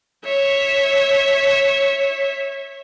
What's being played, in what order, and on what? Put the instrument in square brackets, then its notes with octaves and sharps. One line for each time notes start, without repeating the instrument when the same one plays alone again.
[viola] C#5 E5